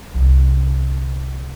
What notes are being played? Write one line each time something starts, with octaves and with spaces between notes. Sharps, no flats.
C2 D3